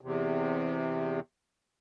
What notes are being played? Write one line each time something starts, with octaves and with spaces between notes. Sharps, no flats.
E2 C3